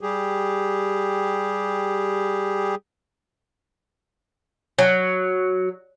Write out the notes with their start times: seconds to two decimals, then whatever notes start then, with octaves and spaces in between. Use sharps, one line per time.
0.01 G3 G4 G#4
4.78 F#3 C#5